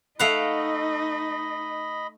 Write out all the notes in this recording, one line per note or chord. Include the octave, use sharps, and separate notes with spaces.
A3 D#4 D#5 F5 F#5 B5